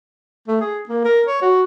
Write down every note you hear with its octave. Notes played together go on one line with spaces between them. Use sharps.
A3
G#4
A#3
A#4
C#5
F#4